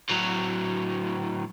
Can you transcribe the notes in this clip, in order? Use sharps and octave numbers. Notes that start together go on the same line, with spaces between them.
A2 F#3